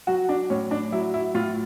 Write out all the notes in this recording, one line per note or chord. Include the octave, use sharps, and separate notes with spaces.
F#3 F#4
D4
A2 C#4
D4
F#3 E4
E4
A2 F4